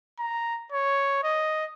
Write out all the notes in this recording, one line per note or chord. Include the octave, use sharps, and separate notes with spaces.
A#5
C#5
D#5